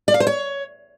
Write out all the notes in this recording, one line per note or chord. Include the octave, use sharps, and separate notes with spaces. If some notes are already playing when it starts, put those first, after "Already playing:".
D5
F5
C5
C#5